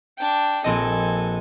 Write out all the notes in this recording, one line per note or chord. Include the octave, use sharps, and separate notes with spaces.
D4 G5
A#1 C4 A4 D#5 G#5